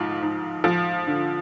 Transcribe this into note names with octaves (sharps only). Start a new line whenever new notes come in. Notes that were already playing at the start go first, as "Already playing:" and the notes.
Already playing: G#2 F3
G#2
F3
D3